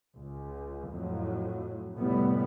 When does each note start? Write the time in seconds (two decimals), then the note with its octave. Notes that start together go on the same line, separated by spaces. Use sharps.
0.17 C#2
0.90 F2 A2 F#3
1.97 F1 A2 G3 B3